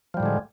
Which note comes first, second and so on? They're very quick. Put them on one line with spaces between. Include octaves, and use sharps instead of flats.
F3 G3 A2 D3 G#3